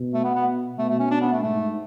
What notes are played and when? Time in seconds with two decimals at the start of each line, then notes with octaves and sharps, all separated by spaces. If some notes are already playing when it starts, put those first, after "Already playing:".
Already playing: B2
0.14 A3
0.24 B3
0.35 B3
0.78 B2 A3
0.89 A3
0.99 C#4
1.11 D4
1.22 B3
1.32 A3
1.43 G#2 A3